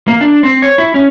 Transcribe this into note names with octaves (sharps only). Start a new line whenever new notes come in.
A#3
D4
C4
C#5
E4
C#4